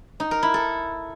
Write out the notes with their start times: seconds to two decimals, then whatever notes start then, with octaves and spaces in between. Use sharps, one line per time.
0.20 D#4
0.31 A#4
0.43 E4
0.54 A4